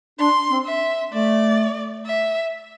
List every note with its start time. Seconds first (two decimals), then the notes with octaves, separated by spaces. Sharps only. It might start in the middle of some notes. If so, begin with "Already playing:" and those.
0.19 D4 C6
0.51 C4
0.66 E5
1.13 A3 D5
2.06 E5